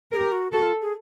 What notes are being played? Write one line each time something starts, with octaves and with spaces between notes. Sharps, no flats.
G4 G#4 A#4
F#4
F#4 A4
F4
G#4